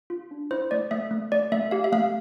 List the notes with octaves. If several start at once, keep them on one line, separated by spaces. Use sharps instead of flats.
F4
D4
E4 C5
A3 D5
A3 E5
A3
A3 D5
A3 E5
G4 F5
E5
A3 F5